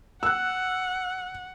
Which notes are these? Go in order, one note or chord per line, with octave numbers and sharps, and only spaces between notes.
F#5 E6 F#6